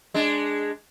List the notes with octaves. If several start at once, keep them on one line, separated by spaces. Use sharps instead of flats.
G#3 D4